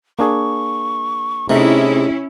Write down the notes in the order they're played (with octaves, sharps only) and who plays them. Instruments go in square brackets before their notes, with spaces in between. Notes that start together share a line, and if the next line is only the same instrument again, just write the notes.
[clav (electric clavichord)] A#3 D4 G#4 [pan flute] C#6
[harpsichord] C3 [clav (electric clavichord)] A3 D#4 E5 [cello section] C#4 E4 [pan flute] G#4